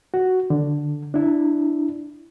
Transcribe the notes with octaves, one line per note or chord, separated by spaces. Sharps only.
F#4
D3
D4 E4